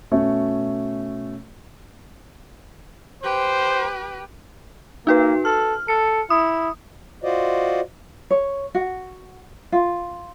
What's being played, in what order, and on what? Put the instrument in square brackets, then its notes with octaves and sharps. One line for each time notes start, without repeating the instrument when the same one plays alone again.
[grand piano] B2 A3 C#4
[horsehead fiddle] G4 B4 [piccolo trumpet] C5
[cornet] A#3 [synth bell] D#4 F#4 B4
[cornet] A4 [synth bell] F6
[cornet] A4 [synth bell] C#7
[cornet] E4 [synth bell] D#6
[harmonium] F4 F#4 C5 D5 D#5
[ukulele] C#5
F#4
F4